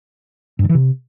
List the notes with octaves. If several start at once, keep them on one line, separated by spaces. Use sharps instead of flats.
G2
D3
E3
C3